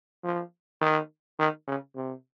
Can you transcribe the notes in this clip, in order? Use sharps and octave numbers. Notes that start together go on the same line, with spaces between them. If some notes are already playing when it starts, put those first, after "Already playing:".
F3
D#3
D#3
C#3
C3